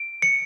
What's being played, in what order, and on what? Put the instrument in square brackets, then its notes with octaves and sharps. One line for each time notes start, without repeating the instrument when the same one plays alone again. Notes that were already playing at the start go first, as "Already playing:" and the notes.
Already playing: [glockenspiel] D7
C#7